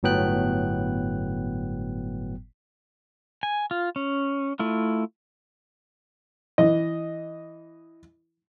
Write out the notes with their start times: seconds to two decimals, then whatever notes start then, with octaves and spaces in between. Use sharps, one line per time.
0.03 G1 A2 F#3 B3 G5 F#6
3.43 G#5
3.71 F4
3.96 C#4
4.59 A3 E4 F4
6.58 E3 D#5